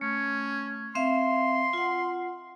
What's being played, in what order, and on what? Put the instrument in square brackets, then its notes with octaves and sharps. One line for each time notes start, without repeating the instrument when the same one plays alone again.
[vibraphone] A3 [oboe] C#4
[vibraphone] C4 E5 F5 [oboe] C6
[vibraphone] F4 F#5